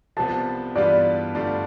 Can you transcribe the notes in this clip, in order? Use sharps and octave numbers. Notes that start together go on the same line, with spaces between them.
C2 C3 F3 B3 A5
G2 E3 G3 B3 F4 D5
G2 D3 A3 D4 F4